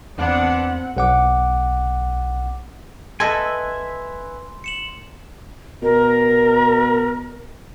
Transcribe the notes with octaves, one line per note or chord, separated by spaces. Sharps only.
E2 B3 C4 D4 F#5
B1 F#5 D6
A4 B4 D#5 E5 G#5 C6
C#7 E7 F#7
B2 A#4